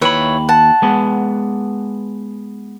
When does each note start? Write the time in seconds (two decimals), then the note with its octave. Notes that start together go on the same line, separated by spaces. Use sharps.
0.01 D#2 E4 B4 C#5 B5
0.48 F#5 A5
0.82 G#3 B3